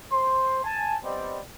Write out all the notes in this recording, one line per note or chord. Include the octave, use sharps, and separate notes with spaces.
C5 C6
G#5 A5
G3 B3 C4 D5 D#5